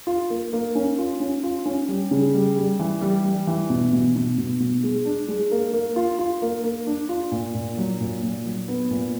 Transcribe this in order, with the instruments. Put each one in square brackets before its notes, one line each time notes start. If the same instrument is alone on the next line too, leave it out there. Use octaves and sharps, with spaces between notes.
[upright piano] F4
A#3
A#3
C#4
F4
C#4
F4
C#4
G3
C#3
G3
G3
E3
G3
G3
E3
B2
B2
B2
B2
B2
G#3
D4
G#3
A#3
A#3
F4
F4
A#3
A#3
D4
F4
A#2
A#2
F#3
A#2
A#2
F#3
B3
A#2